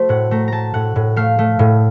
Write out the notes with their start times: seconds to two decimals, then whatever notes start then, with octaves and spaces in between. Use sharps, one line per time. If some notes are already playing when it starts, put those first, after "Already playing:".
Already playing: A3 F#4 C5
0.09 A2 F#5
0.31 A3 A#5
0.48 A3 A5 A#5
0.74 A2 F#5
0.96 A2
1.16 A3 F5
1.39 A3
1.59 A2